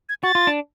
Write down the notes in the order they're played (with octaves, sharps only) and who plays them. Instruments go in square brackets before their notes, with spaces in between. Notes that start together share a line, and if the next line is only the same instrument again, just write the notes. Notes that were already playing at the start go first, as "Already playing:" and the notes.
[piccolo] G#6
[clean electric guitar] F#4 [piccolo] A6
[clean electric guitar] F4
D4